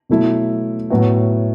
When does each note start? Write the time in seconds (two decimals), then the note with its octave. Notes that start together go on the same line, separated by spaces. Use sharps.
0.09 B2 F#3 A3 E4
0.90 A2 F#3 B3 F#4